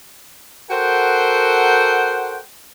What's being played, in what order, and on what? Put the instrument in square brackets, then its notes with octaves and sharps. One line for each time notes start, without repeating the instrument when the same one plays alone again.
[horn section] F#4 A4 A#4 C5 F#5 G5